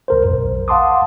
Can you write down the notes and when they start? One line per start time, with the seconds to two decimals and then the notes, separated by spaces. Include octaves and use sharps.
0.08 C#2 A#4 C5
0.25 B1 F2
0.68 F5 F#5 A5 C6 D6 D#6